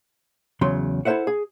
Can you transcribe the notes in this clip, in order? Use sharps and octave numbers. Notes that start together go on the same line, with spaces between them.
E2 C#3 F#3 C6
E4 A4 A#4 C5 E5 F#5
G#4